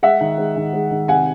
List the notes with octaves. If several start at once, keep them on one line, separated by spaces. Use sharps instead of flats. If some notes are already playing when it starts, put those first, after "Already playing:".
G#3 E5 F#5
D#3
G#3
D#3
G#3
D#3
C3 F#5 G#5